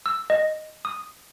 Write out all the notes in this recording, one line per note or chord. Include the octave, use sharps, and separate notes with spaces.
E6
D#5
D#6